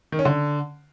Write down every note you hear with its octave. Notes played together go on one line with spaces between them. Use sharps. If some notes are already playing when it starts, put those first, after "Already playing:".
D#3
C#4
D3